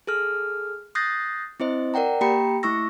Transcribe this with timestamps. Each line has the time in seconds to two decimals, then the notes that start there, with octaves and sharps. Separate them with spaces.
0.07 G#4 A4 F6
0.95 D#6 F#6 G6 A6 A#6 C7
1.60 C4 E4 C5 D#5
1.94 A#4 D5 F#5 G5 A#5
2.21 A#3 G4 G5 A#5 B5 C#7
2.63 A3 E4 C#6 E6 A#6